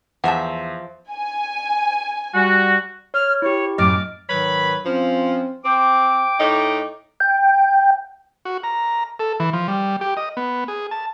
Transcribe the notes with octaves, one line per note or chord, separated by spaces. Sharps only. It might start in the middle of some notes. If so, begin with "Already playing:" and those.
E2 F3 E5 F#5 A5
G#5
G3 F#4
C#5 F6
E4 G4 C#5
F#2 A2 D#5 D6 F6 A6
G#2 D#3 F#3 B4 C#5 B5
F3 C4 C#4
C4 G5 D6
A2 D#4
G5
F#4
A#5
A4
E3
F3
G3
G4
D#5
B3
G#4
A5